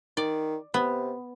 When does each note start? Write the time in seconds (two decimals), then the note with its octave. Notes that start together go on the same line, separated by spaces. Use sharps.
0.17 D#3 D5
0.74 C3 B3